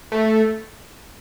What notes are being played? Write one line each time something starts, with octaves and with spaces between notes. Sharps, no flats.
A3